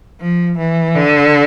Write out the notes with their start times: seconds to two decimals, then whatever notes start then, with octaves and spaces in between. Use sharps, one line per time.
0.21 F3
0.58 E3
0.95 D3